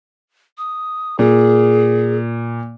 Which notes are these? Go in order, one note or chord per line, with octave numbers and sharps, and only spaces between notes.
D#6
A#2 G#4